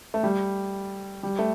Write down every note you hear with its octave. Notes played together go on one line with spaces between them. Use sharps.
A3
G3
G3
A3